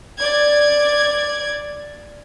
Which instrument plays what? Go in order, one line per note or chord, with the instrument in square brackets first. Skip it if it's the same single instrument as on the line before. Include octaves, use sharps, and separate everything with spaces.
[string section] D5 G#6